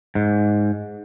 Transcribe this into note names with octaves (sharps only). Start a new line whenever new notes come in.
G#2